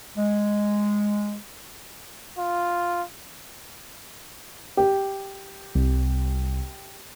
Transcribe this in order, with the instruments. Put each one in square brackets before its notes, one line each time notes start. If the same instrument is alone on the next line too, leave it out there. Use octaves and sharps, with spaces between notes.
[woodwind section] G#3
[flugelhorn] F4
[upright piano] G4
[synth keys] C2